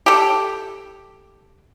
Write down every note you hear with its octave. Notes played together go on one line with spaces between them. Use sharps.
G4 A4